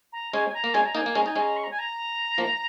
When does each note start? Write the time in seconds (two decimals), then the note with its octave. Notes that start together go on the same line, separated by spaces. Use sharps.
0.13 A#5
0.33 G#3 C#4 G#5
0.48 G#5
0.54 A#5
0.64 A#3
0.74 G#3 C#4 G#5
0.86 A#5
0.95 A#3 D#4 G#5
1.06 A#3
1.15 G#3 C#4 A#5
1.26 D#4 G#5
1.36 G#3 C#4 A#5
1.57 C#6
1.64 A#5
1.71 G#5
1.79 A#5
2.38 F3 A#3